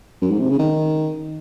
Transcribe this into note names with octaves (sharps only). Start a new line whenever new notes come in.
F#2
G#2
C3
C#3
D#3